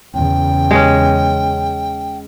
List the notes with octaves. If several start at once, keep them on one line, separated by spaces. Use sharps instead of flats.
E2 C#3 G5
G#3 C#4